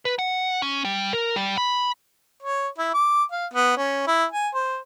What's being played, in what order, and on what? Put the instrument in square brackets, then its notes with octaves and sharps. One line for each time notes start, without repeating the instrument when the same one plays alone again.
[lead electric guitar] B4
F#5
C#4
G3
A#4
G3
B5
[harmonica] C#5
E4
D6
F5
B3
C#4
E4
G#5
C5